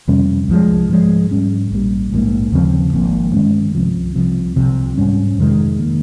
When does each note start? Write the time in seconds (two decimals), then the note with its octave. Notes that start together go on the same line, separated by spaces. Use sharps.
0.08 F2 C3 G3 C#4
0.48 C2 C3 F3 G#3
0.89 G#2 F3 G#3
1.31 G#2 G3 C#4
1.71 A#1 A#2 G3
2.12 A#1 G#2 F3 A#3
2.52 D#2 C#3 F3 C4
2.93 G#1 G#2 F3 A#3
3.34 G2 D#3 G#3 C#4
3.75 C2 C3 F3
4.16 C2 C3 F3
4.56 C2 C3 F3
4.97 G#2 G3 C#4
5.38 F2 C3 D#3 G#3
5.79 D#3 A#3